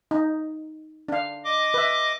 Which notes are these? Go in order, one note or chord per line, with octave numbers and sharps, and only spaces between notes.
D#4
D4 F5
D#5 D6
B4 E5